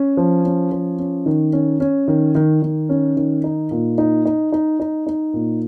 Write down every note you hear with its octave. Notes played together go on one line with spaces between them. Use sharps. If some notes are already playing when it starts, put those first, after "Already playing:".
Already playing: C#4
F3
C#4
F3
C#4
D#3
C#4
C#4
D#3
D#3
D#3
C#4
D#3
D#4
A#2
D#4
D#4
D#4
D#4
D#4
A#2